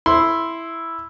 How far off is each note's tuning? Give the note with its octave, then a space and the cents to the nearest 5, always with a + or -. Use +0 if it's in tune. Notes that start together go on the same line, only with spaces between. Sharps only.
E4 +0 C6 +0